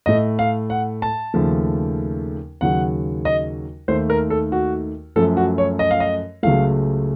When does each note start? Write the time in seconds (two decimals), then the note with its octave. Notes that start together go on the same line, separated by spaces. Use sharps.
0.06 A2 A3 D#5
0.39 F5
0.70 F#5
1.02 A5
1.34 D#2 C#3 F3 A3
2.61 D#2 C#3 F#3 F#5
3.25 D#5
3.88 D#2 D#3 A3 C5
4.10 A#4
4.30 A4
4.52 F#4
5.16 F#2 F3 A3 A4
5.37 F#4
5.58 C#5
5.79 D#5
5.91 F5
6.00 D#5
6.43 C#2 C#3 F#3 A3 F5